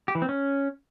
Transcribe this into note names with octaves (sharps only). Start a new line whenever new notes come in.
G4
E3
C4
C#4